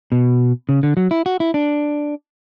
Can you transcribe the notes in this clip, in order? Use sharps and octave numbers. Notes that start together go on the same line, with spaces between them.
B2
C#3
D3
F#3
E4
F#4
E4
D4